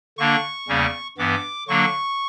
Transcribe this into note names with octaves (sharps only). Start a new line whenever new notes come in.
D3 A#3 D4 C#6
E2 C#3 G3 A#3 C#4
G2 E3 B3 D6
D3 F#3 A#3 D4 C#6